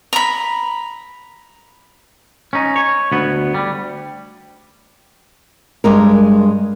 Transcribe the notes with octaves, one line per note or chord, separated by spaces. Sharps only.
A#5 B5
C#4 D#4
C#5
D2 B3
G3
G2 G#3 A#4